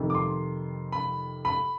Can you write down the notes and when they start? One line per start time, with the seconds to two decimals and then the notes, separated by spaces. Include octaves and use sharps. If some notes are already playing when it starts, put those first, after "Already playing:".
Already playing: F2 C3 D#3
0.10 D6
0.15 C6
0.92 B5
1.45 B5